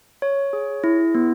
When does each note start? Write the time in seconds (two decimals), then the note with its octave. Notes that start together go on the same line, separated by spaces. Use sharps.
0.22 C#5
0.53 G#4
0.84 E4
1.15 B3